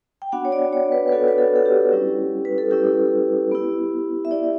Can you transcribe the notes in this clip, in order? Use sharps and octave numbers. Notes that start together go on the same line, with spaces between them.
G5
B3 D4 F#4 F#5
C#5
D5
C#5
B4
B4
B3 D4 F#4 A4
B4
A4
A4
G4
G3 C#4 E4
B4
A4
G3 C#4 E4 G4
B3 E4
E5
B3 E4 D5